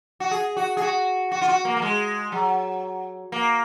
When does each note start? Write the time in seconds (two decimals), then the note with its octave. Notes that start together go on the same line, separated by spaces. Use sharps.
0.20 F#4
0.31 G#4
0.57 F#4
0.77 G#4
0.82 F#4
1.32 F#4
1.41 F4
1.48 F#4
1.65 A#3
1.77 A#3
1.82 G#3
2.32 F#3
3.32 A#3